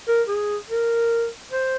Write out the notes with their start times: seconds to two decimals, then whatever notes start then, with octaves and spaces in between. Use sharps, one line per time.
0.08 A#4
0.29 G#4
0.70 A#4
1.52 C5